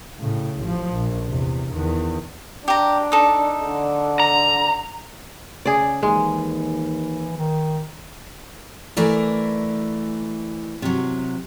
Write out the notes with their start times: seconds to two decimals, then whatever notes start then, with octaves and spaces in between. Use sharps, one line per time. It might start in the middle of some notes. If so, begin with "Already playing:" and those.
0.20 A2 C#3
0.61 A1 F3
0.92 A#1
1.27 E2 C3
1.72 E2 D#3
2.68 D4 G4 A#5
3.12 D#4 A4
3.66 D3
4.20 A#5
5.66 C#3 G#4 D5
6.03 D#2 E3 G#3
7.37 D#3
8.97 E3 A3 A#4 D5
10.82 C3 F#3